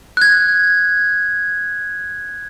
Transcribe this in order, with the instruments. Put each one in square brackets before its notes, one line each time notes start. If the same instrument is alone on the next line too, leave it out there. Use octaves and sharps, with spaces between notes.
[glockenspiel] F#6 G#6